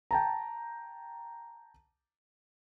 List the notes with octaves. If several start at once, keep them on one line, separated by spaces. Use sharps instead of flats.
G5 A5 A#5